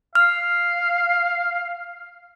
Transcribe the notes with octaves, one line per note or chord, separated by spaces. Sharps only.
F5 F6